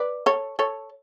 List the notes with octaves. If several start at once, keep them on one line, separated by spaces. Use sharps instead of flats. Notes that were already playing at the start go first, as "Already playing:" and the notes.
Already playing: B4 D5
A4 C#5
A4 C#5